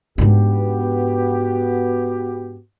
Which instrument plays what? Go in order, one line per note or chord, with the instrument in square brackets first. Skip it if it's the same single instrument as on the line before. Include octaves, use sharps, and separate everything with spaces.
[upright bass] G#2 D4 [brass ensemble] B3 F#4 G4